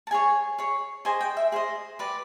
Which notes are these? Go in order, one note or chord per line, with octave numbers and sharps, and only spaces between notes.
A5
G#4 C#5 G#5
G#4 C#5
G#4 C5 D#5 G#5
G5
E5
G#4 C5 D#5
G4 B4 D5